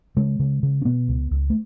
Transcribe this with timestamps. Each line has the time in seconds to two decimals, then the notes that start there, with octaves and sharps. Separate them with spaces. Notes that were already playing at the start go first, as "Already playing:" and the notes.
0.17 C#3 G#3
0.39 C#3
0.63 C#3
0.82 C#4
0.85 B2 B3
1.08 C#2
1.31 C#2
1.50 A3